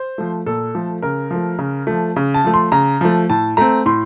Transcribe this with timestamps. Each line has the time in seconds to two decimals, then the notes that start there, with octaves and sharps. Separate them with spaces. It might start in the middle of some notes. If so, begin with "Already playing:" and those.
Already playing: C5
0.18 F3 A3
0.46 A#2 A4
0.75 F3 A3
1.02 C#3 A#4
1.31 F3 A3
1.59 C#3
1.87 F3 A3
2.16 C#3
2.34 A5
2.44 F3 A3
2.54 C6
2.72 C#3 A#5
3.01 F3 A3
3.30 A2 A5
3.57 A3 C4 A#5
3.85 A2 C6